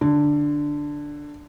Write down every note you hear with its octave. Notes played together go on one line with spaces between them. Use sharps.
D3